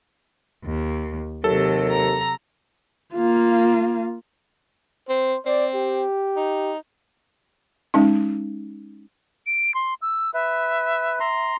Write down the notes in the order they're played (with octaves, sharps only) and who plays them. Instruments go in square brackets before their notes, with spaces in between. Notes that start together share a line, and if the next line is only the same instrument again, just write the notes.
[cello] D#2
[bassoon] D#2 [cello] C3 F#3 [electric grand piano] A4
[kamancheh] A#5
[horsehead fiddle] A#3 F4
[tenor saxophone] C4 [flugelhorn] C5
[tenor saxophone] C4 [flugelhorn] D5
[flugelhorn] G4
[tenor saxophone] D#4
[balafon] G#3 C#4 D#4
[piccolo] D7
C6
E6
[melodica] B4 [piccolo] E5
[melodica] A#5 C6